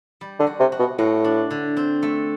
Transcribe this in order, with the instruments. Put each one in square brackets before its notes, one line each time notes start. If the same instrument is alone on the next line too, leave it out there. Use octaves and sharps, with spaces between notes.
[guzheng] G3
[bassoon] D3
[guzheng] F#4
[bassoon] C3
[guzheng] F#4
[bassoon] B2
[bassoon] A2 [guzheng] F#4
[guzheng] D4
D3
C4
A3